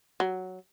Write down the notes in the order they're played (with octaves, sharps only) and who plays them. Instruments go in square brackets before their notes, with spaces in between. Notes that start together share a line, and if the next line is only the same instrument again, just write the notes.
[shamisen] F#3